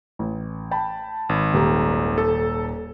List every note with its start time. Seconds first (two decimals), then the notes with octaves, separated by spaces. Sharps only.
0.19 A1
0.71 G5 A5 B5
1.29 G#1
1.54 D#1 G4 A#5
2.18 A4